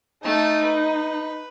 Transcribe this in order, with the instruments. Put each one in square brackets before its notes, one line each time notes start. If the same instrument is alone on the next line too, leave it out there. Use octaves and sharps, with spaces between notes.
[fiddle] A3 A5 [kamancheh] D#4
[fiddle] B4